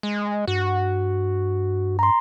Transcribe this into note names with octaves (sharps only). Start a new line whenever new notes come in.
G#3
G2 F#4
A#5 C6